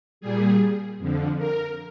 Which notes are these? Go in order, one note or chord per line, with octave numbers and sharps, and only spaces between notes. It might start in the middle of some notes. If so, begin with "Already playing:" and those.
A#2 G3 G#4
F2 D3 F3
A#4